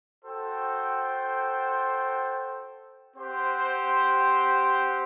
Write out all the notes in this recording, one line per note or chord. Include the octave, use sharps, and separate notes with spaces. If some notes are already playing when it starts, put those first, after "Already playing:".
F#4 A4 C5 G5
C4 G4 C5 F#5